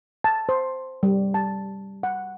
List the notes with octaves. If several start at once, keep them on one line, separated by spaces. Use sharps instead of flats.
A5
C5
G3
A5
F#5